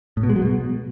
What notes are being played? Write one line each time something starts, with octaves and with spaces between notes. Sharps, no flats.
A2
B2
G#3
F#3
B2